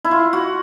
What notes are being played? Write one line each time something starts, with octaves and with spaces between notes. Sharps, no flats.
E4
F4
F#4